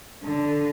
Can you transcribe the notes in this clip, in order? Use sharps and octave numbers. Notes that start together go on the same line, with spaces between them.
D3